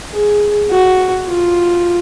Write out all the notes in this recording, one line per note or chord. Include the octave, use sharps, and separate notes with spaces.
G#4
F#4
F4